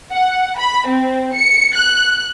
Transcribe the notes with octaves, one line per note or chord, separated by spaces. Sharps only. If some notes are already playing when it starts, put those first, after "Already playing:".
F#5
B5
C4
C#7
F#6